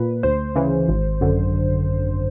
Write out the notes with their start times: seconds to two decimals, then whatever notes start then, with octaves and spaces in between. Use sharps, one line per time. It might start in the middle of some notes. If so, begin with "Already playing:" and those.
Already playing: A#2 B4
0.23 D2 C5
0.55 C#3 E3
0.88 G#1
1.21 F#2 D3